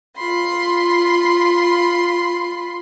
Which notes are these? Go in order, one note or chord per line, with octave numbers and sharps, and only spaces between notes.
F4 B5 C6